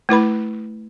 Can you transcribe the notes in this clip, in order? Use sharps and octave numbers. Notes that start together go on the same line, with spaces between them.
A3 E4 B4 B5